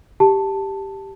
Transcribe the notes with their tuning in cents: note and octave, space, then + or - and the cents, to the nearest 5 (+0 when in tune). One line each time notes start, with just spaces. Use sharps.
G4 +0 A5 +5